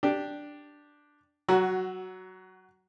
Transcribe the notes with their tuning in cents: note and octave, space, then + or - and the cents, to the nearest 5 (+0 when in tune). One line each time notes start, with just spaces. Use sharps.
D4 +0 G4 +0
F#3 +20 F#4 +0